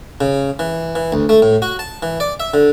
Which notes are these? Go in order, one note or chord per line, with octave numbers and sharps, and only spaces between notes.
C#3
E3
E3
D2
A3
A2
F#4
A5
E3
D5
E5
D3